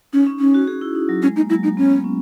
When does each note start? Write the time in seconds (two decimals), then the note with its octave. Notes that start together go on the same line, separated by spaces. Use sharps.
0.13 C#4 D#4
0.27 C#4
0.40 C#4 D#4
0.54 F#4
0.67 G#4
0.81 E4
0.95 D#4
1.09 F#3
1.22 G#3 C#4
1.36 A#3 D#4
1.50 F#3 E4
1.63 A#3 D#4
1.77 B3 C#4
2.04 C#4